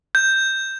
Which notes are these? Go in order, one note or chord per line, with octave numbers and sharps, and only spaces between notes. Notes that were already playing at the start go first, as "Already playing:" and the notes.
G6